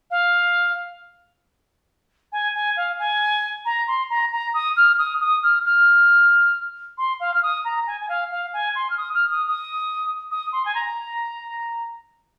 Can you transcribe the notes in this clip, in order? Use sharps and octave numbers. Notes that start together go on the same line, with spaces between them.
F5
G#5
G#5
F5
G#5
A#5
C6
A#5
A#5
D#6
F6
D#6
D#6
F6
F6
C6
F5
F6
D#6
A#5
G#5
G#5
F5
F5
G#5
C6
F6
D#6
F6
D#6
D#6
D#6
C6
G#5
A#5